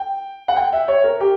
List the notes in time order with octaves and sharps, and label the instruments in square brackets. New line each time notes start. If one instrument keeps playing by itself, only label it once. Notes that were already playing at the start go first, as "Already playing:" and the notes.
Already playing: [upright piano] G5
F#5
G5
E5
C#5
A#4
G4